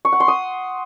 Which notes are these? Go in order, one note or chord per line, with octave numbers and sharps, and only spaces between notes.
C#6
F#5
C6
D#6